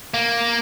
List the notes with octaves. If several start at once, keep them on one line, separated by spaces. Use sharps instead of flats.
A#3